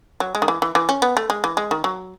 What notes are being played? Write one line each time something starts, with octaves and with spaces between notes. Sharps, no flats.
F#3
G#3
D#3
E3
E3
E3
C#4
B3
A3
G#3
E3
G#3
D#3
F#3